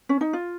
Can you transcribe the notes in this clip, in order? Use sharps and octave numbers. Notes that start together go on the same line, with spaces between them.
C#4
D#4
F4